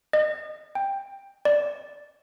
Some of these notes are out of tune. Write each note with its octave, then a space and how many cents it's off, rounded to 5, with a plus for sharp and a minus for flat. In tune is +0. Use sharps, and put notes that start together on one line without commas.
D#5 -35
G5 +15
D5 +0